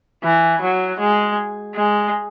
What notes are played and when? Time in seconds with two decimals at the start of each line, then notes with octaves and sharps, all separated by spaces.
0.23 E3
0.61 F#3
0.99 G#3
1.75 G#3